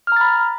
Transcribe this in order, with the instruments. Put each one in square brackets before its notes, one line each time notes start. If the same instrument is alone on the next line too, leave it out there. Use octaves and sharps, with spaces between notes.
[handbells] F6
A#5
A6
B5